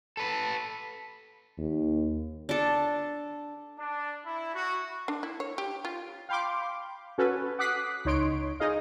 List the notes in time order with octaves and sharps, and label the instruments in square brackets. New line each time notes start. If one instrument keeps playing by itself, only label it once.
[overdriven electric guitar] A4 B4
[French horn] D#2
[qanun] D4 A4
[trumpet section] D4
E4
F#4
[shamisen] D4
E4
C#5
G4
F4
[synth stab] F5 G5 B5 C6 D6
C#4 F#4 A4 B4
F#5 D6 D#6 F#6 B6 C7
C#2 D#4 C#5 C6 D7
D#4 G#4 D#5 F5